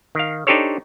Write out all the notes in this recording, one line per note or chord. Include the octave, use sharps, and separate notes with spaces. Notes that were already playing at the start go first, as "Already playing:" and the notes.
D#3 F5
D4 D#4 G4 A4 C5 C#5